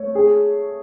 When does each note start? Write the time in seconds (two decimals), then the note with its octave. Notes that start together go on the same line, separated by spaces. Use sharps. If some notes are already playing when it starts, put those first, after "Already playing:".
Already playing: A3 C#5
0.15 G#4